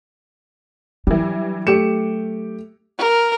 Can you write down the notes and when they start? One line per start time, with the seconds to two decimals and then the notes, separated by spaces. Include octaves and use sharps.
1.07 E3 F#3 G3 D4
1.67 A3 G4 C#7 E7
2.98 A#4